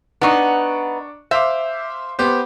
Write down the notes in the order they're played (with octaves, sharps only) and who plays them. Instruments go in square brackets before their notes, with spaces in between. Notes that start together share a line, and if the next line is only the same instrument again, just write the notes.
[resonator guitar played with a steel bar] B3 D#4 [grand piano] D4 C#6
[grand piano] C5 F5 D6 [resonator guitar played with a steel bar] E5
[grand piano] B3 G4 C5